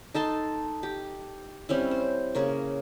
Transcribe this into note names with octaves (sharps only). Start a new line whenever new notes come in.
D#4 A4 A5 C6
G4
G3 C4 C#4 E4
C5
C#3 A#3 C#6